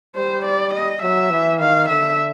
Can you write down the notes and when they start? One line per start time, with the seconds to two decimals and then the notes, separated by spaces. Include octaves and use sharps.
0.16 G3 C5
0.45 D5
0.74 D#5
1.02 F#3 E5
1.30 E3
1.60 D#3 F5
1.89 D3 E5